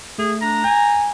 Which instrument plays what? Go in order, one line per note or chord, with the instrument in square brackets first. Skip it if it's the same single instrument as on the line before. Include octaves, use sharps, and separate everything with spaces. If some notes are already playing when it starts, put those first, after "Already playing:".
[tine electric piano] A3 [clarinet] G#4
[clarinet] D4 [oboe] A#5
[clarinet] G#5 [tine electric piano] G6